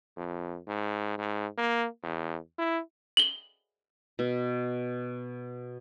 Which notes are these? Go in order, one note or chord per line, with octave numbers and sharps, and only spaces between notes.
F2
G#2
G#2
A#3
E2
E4
F#7 G7
B2